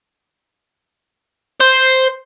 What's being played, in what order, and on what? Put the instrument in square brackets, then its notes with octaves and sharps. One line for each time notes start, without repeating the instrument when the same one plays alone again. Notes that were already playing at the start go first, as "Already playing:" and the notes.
[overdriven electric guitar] C5